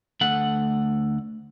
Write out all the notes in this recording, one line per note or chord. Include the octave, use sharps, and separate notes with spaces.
D2 A3 F#5